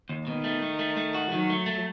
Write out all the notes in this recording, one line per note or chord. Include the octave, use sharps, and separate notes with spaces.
D#2
B2 D#3
A3
A3
A3
A3
F#4
D#3 F#3
A3
A3